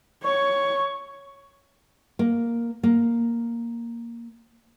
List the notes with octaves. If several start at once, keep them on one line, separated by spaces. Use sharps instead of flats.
C#5 C#6
A#3
A#3